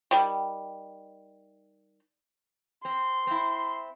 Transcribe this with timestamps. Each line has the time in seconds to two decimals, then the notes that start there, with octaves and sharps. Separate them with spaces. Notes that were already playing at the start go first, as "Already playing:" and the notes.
0.11 D#3 G3
2.85 C4 C6
3.27 C4 E4